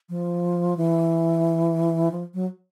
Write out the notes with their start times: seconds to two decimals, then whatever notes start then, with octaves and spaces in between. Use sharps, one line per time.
0.09 F3
0.77 E3
2.11 F3
2.34 F#3